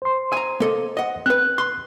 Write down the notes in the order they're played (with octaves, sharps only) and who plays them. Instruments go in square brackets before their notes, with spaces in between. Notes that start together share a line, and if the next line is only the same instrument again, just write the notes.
[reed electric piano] C5 C6
[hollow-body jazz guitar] G#5 A#5
A#3 A4 D#5
D#5 F#5
[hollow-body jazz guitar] C4 B4 [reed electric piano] F#6
[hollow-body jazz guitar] C6